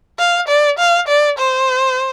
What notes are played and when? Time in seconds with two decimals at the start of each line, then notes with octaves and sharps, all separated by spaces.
0.19 F5
0.48 D5
0.79 F5
1.08 D5
1.39 C5